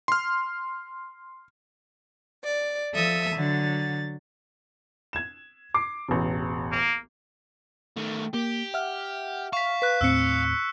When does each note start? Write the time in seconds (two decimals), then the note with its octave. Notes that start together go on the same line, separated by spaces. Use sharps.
0.08 C6 F6
2.45 D5
2.95 F3 A4 E5 D#6
3.36 D3 F#3 A6
5.13 G#6 E7
5.74 D6 C7
6.09 E1 A1
6.72 A#3
7.97 D#3 A3
8.34 A#3 G4
8.74 E5 F#5 F6
9.53 F5 C#6 B6
9.82 B4 F#6 B6
10.01 D#2 A2 C4 E6 C#7